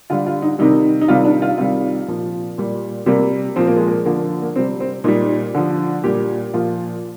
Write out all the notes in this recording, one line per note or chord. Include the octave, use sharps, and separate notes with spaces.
D3 G3 F4
F4
D#4
C3 D#3 G3 D#4
D#4
C3 D#3 G3 F4
D4
F4
C3 D#3 G3 F4
A#2 F3
A#2 G3
C3 G3 A#3
A#2 F3 C4
A#3
G#3
A#3
D3 F3 A#3
A#3
A#3
C3 G3 C4
C4
A#2 G3 D#4
D3 F3
A#2 G3 G4
A#2 F3 F4